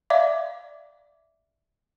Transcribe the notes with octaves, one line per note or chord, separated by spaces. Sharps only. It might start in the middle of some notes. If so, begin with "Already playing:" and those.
D5 E5 F5 D6